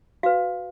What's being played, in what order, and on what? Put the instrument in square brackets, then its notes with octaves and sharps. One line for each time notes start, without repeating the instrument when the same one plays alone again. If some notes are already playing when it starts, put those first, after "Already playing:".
[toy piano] F#4 B4 F5